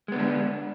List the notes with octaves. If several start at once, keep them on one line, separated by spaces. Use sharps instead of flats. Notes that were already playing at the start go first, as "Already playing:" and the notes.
D3 G#3 B3 D4